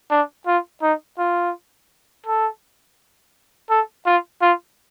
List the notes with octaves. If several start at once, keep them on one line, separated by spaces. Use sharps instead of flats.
D4
F4
D#4
F4
A4
A4
F4
F4